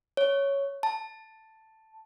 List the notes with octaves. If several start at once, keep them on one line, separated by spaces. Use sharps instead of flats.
C#5
A5